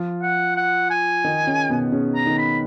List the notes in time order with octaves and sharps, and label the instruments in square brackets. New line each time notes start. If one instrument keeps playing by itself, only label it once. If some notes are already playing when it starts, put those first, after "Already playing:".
Already playing: [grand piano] F3 F4
[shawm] F#5
F#5
G#5
[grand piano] D#3 D#4
C#3 C#4
B2 B3
C#3 C#4
[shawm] A#5
[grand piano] D#3 D#4
[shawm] B5